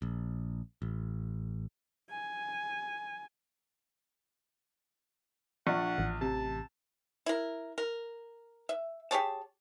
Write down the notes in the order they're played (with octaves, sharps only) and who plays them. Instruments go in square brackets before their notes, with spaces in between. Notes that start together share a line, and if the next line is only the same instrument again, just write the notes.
[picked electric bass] A#1
A1
[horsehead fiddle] G#5
[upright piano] A#1 D4 [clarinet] F#5 [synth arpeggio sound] C#6
[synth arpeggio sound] A1
[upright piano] C3 [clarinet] A5
[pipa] E4 A#4
A#4
E5
G4 G#4 C#5 A5